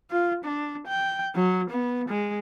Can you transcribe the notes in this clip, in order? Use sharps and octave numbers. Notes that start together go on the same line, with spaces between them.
F4
D4
G5
F#3
B3
G#3